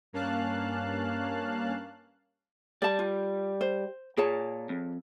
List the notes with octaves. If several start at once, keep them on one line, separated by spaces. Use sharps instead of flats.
G2 A#3 C#4 F5 A5 F#6
G3 D5 A5
F4
C5
A#2 G#4 C#5 A5
F2